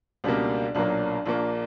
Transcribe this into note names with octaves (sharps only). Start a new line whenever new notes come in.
C#2 B2 G3 A#3 D4
B1 A#2 F#3 A#3 D4
A#1 A#2 A#3 D4